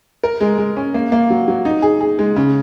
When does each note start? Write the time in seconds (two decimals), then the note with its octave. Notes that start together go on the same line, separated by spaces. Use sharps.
0.24 A#4
0.41 G#3
0.58 G#3
0.77 C#4
0.94 A#3
1.12 A#3
1.30 F#3
1.48 F#3
1.65 D#4
1.82 G#4
2.01 G#4
2.19 G#3
2.36 C#3